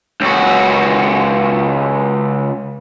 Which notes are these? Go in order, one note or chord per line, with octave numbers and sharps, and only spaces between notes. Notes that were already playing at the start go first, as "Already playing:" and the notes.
C#2 F#4